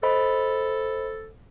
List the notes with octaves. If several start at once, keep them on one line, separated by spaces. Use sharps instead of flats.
A4 C5 D#5 B5